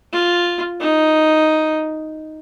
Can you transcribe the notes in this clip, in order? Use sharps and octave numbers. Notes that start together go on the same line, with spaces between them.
F4
D#4